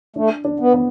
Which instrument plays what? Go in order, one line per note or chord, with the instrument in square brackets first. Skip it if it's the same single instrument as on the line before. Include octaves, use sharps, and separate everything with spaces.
[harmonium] A3 [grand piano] D4
[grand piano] D4
[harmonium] B3
[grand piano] B3